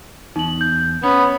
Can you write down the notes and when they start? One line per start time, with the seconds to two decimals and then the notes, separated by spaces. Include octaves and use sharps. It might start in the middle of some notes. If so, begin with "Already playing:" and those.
0.36 E2 D#4 F#7
0.61 G6
1.04 B3 C#4